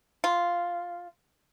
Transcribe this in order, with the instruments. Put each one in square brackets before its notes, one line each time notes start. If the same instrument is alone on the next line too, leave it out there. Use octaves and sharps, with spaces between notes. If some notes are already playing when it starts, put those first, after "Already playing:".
[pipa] F4